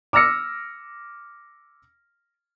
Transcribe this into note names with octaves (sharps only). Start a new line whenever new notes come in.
D6 E6 F6 A#6 C#7